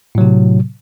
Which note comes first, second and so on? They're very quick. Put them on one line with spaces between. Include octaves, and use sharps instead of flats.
A2 F#3 C3